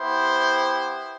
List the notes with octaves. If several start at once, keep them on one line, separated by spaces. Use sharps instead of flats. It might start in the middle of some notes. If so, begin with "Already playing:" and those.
Already playing: B3 E4 G4 C5